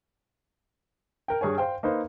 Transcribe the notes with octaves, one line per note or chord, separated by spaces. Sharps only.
A#4 G5
G2 G#4 C#5 G#5
C5 F5 G5
A#3 D#4 B4 C5